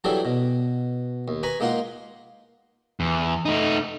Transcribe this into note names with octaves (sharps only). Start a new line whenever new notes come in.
E3 F#3 G3 D4 G#4 A4
B2
D#2
B4 G#5 A#5 B5 C#6
G#3 A#3 D#4 F4 F#5 C6
E2
A3 D#4